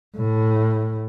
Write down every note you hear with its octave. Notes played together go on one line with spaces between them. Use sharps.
A2